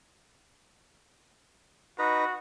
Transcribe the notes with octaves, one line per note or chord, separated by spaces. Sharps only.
D#4 F#4 B4 A#5